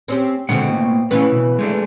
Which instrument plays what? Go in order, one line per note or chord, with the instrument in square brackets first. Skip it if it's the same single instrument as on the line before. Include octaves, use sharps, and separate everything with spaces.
[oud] C4 C#4 G4
[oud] B2 C4 [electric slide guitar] D3 G#3 F#5
[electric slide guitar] A2 A#3
[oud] C#3 E3 B4 [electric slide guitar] A3 C#4
[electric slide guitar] B2
G#3 A3 D4